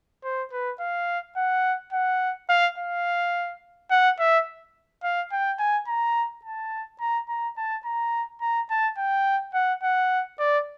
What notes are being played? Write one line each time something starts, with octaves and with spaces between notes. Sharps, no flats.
C5
B4
F5
F#5
F#5
F5
F5
F#5
E5
F5
G5
G#5
A#5
A5
A#5
A#5
A5
A#5
A#5
A5
G5
F#5
F#5
D5